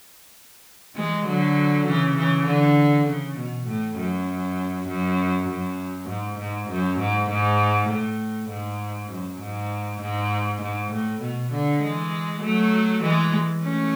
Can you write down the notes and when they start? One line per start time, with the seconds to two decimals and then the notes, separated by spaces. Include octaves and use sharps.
0.96 E3 G#3
1.26 D3 F#3
1.86 C#3 E3
2.16 C#3 E3
2.47 D3
3.07 C#3
3.38 B2
3.67 A2
3.98 F#2
4.88 F#2
5.49 F#2
6.09 G#2
6.39 G#2
6.70 F#2
6.99 G#2
7.30 G#2
7.90 A2
8.50 G#2
9.10 F#2
9.41 G#2
10.01 G#2
10.62 G#2
10.92 A2
11.22 B2
11.52 D3
11.82 E3 G#3
12.42 F#3 A3
13.03 E3 G#3
13.63 A3 C#4